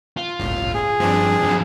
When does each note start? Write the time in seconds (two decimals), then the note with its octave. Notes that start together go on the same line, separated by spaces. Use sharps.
0.17 F4
0.39 G1 C#2 A2
0.74 G#4
1.00 G2 F3 C4 D4
1.43 F2 F#3